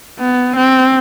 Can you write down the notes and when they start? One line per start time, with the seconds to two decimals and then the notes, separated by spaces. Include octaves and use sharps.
0.20 B3
0.56 C4